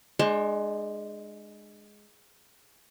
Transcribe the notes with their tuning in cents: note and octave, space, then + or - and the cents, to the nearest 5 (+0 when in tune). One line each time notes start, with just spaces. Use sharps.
G#3 +5 D4 +35 C5 +30